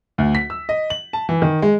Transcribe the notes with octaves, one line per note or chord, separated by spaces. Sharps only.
D2
B6
E6
D#5
F#7
A5
E3
D#3
G#3